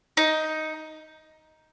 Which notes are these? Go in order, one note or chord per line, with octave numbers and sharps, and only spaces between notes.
D#4